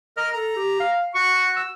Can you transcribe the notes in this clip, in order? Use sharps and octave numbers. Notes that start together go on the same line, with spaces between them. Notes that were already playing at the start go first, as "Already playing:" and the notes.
A#4 D#5 F6
A4 A#5
G4
F5
F#4 C#6
E6